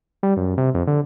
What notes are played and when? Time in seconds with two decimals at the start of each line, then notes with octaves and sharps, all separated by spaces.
0.23 G3
0.37 F#2
0.58 C3
0.74 F2
0.87 D3